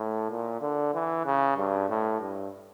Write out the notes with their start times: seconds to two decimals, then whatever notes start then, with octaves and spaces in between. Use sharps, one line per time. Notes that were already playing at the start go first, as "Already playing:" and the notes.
Already playing: A2
0.30 A#2
0.61 D3
0.94 E3
1.26 C#3
1.57 G2
1.89 A2
2.20 G2